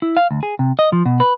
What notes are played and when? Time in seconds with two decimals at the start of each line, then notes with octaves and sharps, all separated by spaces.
0.02 E4
0.17 F5
0.31 D2
0.43 G#4
0.59 C3
0.79 D#5
0.92 F3
1.06 B2
1.20 B4